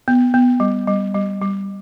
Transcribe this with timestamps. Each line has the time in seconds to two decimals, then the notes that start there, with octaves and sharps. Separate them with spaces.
0.08 B3
0.34 B3
0.60 G3
0.87 G3
1.14 G3
1.41 G3